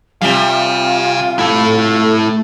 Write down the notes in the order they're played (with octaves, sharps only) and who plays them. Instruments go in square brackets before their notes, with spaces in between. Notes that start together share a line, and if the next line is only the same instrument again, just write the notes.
[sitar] C3 G3 [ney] F4 [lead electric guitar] F5 G#5
[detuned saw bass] A3 [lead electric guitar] E4 A4